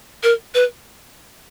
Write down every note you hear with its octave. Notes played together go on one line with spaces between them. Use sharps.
A#4
B4